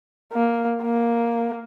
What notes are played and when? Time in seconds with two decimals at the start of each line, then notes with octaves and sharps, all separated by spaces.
0.33 A#3
0.82 A#3